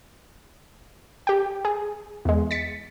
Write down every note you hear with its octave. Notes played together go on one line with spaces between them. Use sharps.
G4 G5
G#4
E2 G#3
A6 B6 C#7